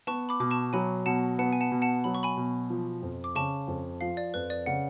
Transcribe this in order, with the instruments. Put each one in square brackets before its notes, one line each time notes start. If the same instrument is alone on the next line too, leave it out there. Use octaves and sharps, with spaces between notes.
[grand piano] B3 [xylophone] A5 C#6
[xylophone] B5 D6
[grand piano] B2 [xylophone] D6
[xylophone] A5 C#6
[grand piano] F#3 [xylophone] G#5 B5
[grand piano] B2 [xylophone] F#5 A5
[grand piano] B3 [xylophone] F#5 A5
[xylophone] G#5
F#5 A5
[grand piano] B2
[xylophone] F#5 A5
[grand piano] F#3 [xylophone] B5
[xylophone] C#6
G#5 B5
[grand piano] B2
F3
F2
[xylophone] D6
[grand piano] C#3 [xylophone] A5 C#6
[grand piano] F2
[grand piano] F3 [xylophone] F5
[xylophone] D5
[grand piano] F2 [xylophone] B4
[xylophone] D5
[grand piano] C#3 [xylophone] F#5